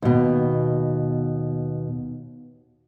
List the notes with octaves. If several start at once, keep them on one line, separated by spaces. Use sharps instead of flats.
D#2 B2